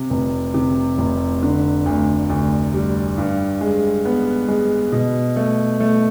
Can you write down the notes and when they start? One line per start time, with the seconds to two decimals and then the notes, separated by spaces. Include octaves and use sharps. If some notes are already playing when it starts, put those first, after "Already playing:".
Already playing: C3
0.10 F1
0.54 C3
0.98 F1
1.43 D3
1.86 D2
2.29 D2
2.74 G3
3.18 G2
3.61 G#3
4.05 B3
4.48 G#3
4.92 B2
5.36 A3
5.80 A3